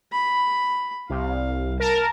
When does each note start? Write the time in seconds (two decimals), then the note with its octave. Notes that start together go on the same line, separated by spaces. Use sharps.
0.13 B5
1.09 C2 F5
1.80 A#4 A5